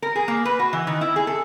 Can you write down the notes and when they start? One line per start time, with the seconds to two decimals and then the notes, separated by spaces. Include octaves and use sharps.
0.02 A#4
0.16 G#4
0.28 A#3
0.45 B4
0.59 F#4
0.73 E3
0.87 D#3
1.01 E4
1.16 G#4
1.27 A4